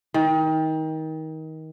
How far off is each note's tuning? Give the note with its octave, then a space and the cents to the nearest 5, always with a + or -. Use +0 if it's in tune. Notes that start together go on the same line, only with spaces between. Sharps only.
D#3 +25